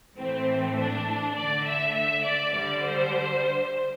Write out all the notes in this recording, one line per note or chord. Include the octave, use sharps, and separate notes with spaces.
A2 E3 A3 C4
D4
D3 A3 D5
E5
E5
D5
D3 G3 D5
C5